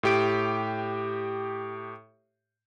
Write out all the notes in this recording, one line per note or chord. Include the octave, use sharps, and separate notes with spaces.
A2 G4 D7